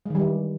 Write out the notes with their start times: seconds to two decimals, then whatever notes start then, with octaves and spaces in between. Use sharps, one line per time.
0.06 G#3
0.10 D#3
0.15 G3
0.20 E3